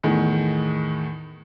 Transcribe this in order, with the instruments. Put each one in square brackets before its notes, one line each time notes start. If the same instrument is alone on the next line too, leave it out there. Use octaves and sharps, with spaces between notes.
[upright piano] E2 A2 D#3